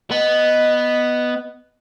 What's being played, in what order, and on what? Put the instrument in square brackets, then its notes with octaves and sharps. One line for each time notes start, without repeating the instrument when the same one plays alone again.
[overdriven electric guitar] B3 [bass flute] D#5